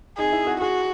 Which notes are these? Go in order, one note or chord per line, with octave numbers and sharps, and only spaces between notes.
D#4 G#4
E4
F#4
F#4 G#4